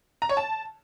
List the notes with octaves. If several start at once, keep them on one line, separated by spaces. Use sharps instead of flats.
A#5
C#5
A5